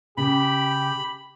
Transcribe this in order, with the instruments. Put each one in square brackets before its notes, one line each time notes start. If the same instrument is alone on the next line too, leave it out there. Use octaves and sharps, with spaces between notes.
[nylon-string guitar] C#3 [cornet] G4 [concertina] B5